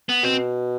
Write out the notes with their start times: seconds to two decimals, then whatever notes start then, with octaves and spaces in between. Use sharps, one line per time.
0.09 B3
0.23 B2 C4